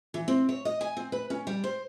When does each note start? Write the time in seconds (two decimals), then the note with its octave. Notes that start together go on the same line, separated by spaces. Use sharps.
0.14 E3
0.28 C4
0.49 C#5
0.65 D#5
0.81 G#5
0.97 C4
1.12 B4
1.30 C#4
1.47 G3
1.64 C5